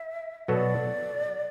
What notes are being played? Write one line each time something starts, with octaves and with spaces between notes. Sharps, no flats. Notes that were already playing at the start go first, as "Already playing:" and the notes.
Already playing: E5
B2 F#3 B3 F#4 A4 D5